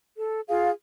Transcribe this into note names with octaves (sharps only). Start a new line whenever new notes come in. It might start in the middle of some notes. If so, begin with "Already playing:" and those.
A4
F4 G#4 F5